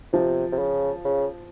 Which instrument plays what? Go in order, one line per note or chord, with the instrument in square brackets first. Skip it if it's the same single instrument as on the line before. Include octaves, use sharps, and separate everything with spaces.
[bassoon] C3 [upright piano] F3
[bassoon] C3
C#3
C#3